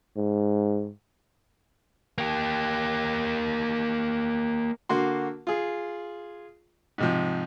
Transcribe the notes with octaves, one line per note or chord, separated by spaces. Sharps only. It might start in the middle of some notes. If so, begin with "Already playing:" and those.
G#2
A#3 G4
D3 A#3 F#4 C6
F4 G#4
G#2 C3 F3